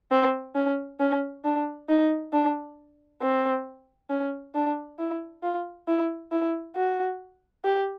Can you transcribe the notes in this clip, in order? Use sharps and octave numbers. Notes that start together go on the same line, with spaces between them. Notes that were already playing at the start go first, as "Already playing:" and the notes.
C4
C#4
C#4
D4
D#4
D4
C4
C#4
D4
E4
F4
E4
E4
F#4
G4